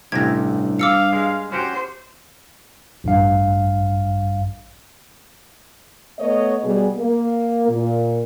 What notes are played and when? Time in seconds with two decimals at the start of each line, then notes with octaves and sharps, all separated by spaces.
0.12 A1 G2 C3 G4 G#6 A#6
0.79 F5 D6 E6 C#7
1.13 G#3
1.52 C#4 F#4 G4 C5
3.04 A1 G2 F5
6.19 A3 B3 C#5 D#5
6.63 B2 G3 B3 G#4
6.97 A#3
7.68 A#2